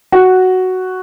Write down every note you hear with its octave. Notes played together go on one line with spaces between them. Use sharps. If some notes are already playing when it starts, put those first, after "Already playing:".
F#4